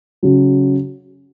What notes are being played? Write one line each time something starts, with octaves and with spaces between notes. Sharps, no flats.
C#3 F#3